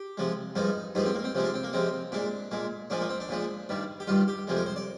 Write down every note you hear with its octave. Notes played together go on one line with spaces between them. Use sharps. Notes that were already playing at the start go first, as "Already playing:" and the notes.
Already playing: G4
C3 F3 G#3
G2 F3 G#3 D#4
G2 F3 G#3 D#4
C4
A#3
C4
C3 F3 G#3
D4
C4
A#3
C3 F3 G#3 C4
A#2 G#3 D4
A#2 G#3
A#2 F3 G#3 D4
A#3
C4
D4
A#2 F3 G#3
G2 D#3 G3
G4
G2 D#3 G3 F4
G4
F2 C3 F3 G#3
A#4
C5
D5